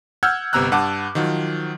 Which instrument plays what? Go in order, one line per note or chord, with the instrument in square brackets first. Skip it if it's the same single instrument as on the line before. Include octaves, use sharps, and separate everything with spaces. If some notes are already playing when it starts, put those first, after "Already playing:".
[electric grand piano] F#5 E6 F6 G6 G#6
G1 C3 B3 A#5 E6 F#6
G2 F#5 A5 D6
D#3 F3 F#3